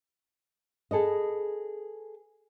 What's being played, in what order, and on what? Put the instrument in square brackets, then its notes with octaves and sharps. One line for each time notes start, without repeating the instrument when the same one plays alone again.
[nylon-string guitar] G#4 A4 B4 D#5